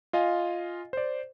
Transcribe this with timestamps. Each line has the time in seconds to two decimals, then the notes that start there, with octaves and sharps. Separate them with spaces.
0.13 F4 D#5 F5 G#5
0.93 C5 D5